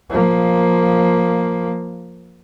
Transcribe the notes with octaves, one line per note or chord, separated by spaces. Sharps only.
F3 A#3